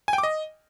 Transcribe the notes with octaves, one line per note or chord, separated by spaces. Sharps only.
G#5
G5
D6
D#5